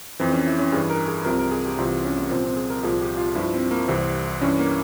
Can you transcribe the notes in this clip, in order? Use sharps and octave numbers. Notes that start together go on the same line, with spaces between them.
F2 E3 C4
C#4
E4
C#4
G2 E3 G#4
A#4
G#4
C2 C3 F3 A#4
A#4
G#4
G4
C2 C3 E3 F4
C#4
A#3
C2 A#2 F3 C4
C4
G#4
A#4
C2 A#2 F3 G#4
G4
F4
G2 F3 E4
C4
A#3
C2 C3 E3 C4
G2 E3 C#4
A#3